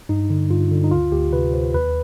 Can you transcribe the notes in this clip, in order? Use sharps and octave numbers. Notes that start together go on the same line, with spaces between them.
G2 D#4
D3
G2 F4
D3
D#4
D2 F4
D2 G4
C3 B4
D2 C5
D#2 B4